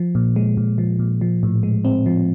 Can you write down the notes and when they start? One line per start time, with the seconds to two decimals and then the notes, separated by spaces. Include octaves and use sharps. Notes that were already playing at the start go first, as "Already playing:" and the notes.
Already playing: F3
0.15 A#2
0.36 G#3
0.57 A#2
0.78 F3
0.99 A#2
1.21 F3
1.43 A2
1.63 G#3
1.85 C4
2.06 F3